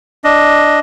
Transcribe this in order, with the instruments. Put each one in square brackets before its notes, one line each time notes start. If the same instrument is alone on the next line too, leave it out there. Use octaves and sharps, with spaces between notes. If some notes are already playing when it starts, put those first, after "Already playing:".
[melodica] D4 D#5